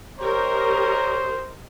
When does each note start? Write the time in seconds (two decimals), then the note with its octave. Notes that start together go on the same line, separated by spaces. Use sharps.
0.20 G4 A#4 C5 C#5 D#5 A#5